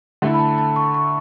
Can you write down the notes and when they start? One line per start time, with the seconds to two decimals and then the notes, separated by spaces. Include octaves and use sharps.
0.22 D3 A3 E4
0.34 B5
0.39 A5
0.58 A5
0.76 C#6
0.94 C#6